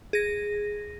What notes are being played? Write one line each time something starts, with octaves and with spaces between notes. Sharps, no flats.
G#4 A#6